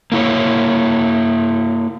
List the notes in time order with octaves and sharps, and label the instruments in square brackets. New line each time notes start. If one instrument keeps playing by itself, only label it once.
[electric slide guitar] A#3 E4 C#5